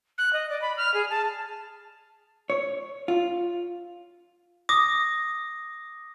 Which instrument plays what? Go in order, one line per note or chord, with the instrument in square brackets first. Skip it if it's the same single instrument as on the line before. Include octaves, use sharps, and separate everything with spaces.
[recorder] F#6
D#5
D5
B5
F6
G#4
A5
[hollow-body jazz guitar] C#5
F4
[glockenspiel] D6 D#6 A#6